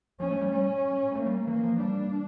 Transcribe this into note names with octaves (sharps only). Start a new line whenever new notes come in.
F3 C#4
A3
G3
G3 C#4
A3 A#3
G3
E3 A#3
F3
G3 D4